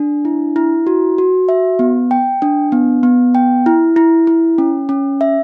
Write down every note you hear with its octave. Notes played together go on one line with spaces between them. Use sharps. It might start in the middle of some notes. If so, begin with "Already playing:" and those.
Already playing: D4
E4
E4
F#4
F#4
E5
B3
G5
D4
B3
B3
G5
E4
E4
E4
C#4
C#4
E5